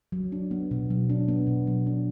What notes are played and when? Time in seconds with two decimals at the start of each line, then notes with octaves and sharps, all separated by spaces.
0.12 F#3
0.32 D4
0.51 B3
0.71 B2
0.90 F#3
1.10 D4
1.28 B3
1.47 B2
1.67 F#3
1.87 D4